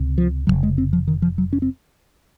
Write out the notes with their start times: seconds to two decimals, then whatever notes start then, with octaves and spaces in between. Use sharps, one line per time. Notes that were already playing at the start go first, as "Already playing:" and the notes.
Already playing: C#2 C3
0.18 F3
0.47 F1 D#2 C#3 F#3
0.63 G#3
0.78 C4
0.93 F3
1.08 D#3
1.22 F3
1.38 F#3
1.53 C#4
1.62 C4